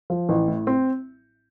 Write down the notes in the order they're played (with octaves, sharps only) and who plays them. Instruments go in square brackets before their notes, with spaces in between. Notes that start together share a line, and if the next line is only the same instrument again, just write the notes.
[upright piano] F3
A1
A2
C4